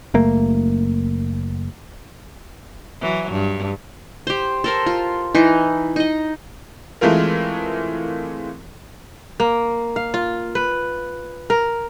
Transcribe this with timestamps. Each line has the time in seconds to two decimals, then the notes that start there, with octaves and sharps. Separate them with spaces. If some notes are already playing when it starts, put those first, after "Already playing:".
0.14 F#1 A3 A#3
3.01 E3 F#3
3.31 G2
4.27 G4 C5
4.64 A4 A#4 C5
4.86 F4
5.35 E3 D#4
5.96 D#4 D#5
7.01 E3 G#3 A3 C4 F4 A#4
9.40 A#3
9.96 F5
10.14 F4
10.55 B4
11.50 A#4